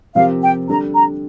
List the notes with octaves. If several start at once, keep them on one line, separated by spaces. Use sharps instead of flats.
C3 F3 C4 G4 A#4 F5
G5
D3 G3 D4 A4 A#5
A#5